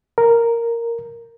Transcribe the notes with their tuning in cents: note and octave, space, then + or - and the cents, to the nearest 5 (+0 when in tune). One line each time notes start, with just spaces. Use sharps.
A#4 -5